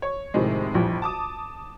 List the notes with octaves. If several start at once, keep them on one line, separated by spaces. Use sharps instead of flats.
C#5
A2 C3 D#3 F3 G#3
A#1 F2 E3 G3
A5 D6 D#6